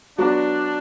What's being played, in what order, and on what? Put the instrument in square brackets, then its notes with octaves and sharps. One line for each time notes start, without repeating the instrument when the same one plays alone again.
[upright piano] F#3 B3 F#4 [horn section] D4